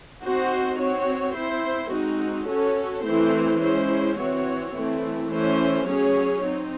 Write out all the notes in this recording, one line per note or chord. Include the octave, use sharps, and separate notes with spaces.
C4 D#4 F#4 C5
C4 F#4 C#5
C4 E4 C5
G#3 C4 D#4 F#4
C#4 F#4 A4 C#5
E3 A3 C4 E4 C5
G#3 C#4 E4 C5
E3 C4 F#4 C#5
E3 A3 C4 E4
E3 A3 C#4 E4 C5
F#3 C#4 G#4 C#5
C4 D#4